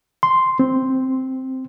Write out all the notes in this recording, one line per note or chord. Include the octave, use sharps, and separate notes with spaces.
C6
C4